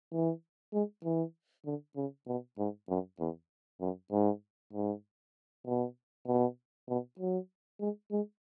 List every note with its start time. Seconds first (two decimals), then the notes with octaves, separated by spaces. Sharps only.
0.12 E3
0.73 G#3
1.04 E3
1.65 D3
1.96 C#3
2.27 B2
2.58 G#2
2.89 F#2
3.19 E2
3.81 F#2
4.11 G#2
4.73 G#2
5.66 B2
6.27 B2
6.88 B2
7.19 F#3
7.80 G#3
8.11 G#3